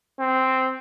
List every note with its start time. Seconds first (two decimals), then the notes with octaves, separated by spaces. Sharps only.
0.19 C4